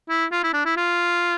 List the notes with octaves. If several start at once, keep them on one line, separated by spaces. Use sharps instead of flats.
E4
F4
E4
D4
E4
F4